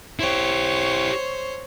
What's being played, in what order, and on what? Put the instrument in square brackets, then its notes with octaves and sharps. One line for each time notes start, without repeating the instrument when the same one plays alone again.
[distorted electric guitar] E4 G4 [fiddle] C5 C#5